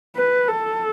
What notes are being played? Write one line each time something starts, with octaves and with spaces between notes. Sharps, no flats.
B4
A4